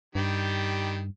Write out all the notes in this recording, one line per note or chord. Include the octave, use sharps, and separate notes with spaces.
G2 D#3 G3 G4